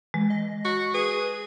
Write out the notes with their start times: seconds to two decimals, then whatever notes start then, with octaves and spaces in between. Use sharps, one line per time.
0.14 E3 G#3
0.30 D#5
0.65 F#4
0.94 G#4 B4